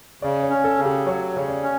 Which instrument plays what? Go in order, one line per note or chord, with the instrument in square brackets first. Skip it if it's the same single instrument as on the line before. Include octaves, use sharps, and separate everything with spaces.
[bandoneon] C#3 [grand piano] D5
[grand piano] C#5
[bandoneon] C#4
[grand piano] A4
[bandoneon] C#3
[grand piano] G4
[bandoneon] F#3 [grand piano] C#5
[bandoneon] C#3 [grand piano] C#5
[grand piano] D5
[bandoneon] C#4